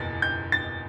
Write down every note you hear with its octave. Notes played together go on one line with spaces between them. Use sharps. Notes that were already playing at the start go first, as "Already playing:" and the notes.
Already playing: F#1 E2 B2 A6
G6
A6